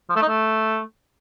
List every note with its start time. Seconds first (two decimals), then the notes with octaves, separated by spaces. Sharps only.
0.09 F3
0.16 A3
0.22 D#4
0.28 A3